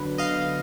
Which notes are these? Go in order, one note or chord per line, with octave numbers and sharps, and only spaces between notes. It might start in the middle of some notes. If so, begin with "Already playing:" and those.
Already playing: D3 F#3 B3 D4 B4
D#5 F5